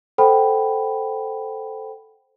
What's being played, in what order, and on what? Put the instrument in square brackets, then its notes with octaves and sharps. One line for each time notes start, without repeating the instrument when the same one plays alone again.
[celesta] A4 C5 F#5 G5 B5